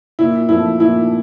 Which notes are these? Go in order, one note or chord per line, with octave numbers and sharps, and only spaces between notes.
A#2 E4
F3 A3 E4
A#2 E4